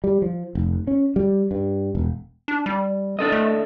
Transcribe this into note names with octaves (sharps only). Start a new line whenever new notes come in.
G3
F3
F1
C#4
G3
G2
E1
D4
G3
D4 A4 D#5
A3